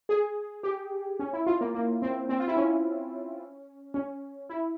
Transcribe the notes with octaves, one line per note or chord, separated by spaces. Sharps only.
G#4
G4
C#4
E4
F4
A#3
A#3
C4
C4
F4
E4
C#4
C#4
E4